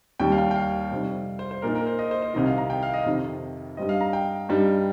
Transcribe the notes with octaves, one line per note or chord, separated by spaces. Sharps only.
D#2 D#3 G3 G5
F5
G5
G5
F5
F2 C3 G3 C4 D#4
C5
C5
A#2 A#3 D#4 A#4
A#4
C5
D#5
C5
C5
C2 C3 D#3 D#5
F5
A#5
G5
F5
D#5
F2 C3 D#3
G2 G3 C4 D#5
F5
A#5
G5
G2 G3 D#4